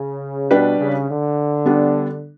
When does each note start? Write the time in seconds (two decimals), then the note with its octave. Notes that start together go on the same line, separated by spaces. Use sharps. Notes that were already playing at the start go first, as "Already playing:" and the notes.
Already playing: C#3
0.51 B2 G3 D4 G4 B4
0.79 C#3
1.08 D3
1.66 G3 B3 D4